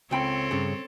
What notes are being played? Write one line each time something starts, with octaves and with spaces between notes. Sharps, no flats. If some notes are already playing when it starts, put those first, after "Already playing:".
C#2 C4 A4 C#5 G5 B5
G2 C#3